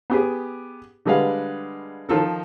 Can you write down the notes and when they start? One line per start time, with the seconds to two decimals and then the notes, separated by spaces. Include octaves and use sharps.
0.10 B3 G4 G#4
1.05 D3 G3 G#3 B4 F5 F#5
2.09 D#3 F3 F4 A4 A#4